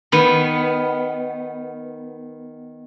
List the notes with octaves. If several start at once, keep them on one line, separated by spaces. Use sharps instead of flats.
D#3 B3